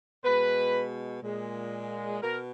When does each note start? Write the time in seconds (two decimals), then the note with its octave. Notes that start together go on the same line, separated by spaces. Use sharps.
0.24 B2 G#3 B4
1.23 A#2 G#3
2.22 B2 A#4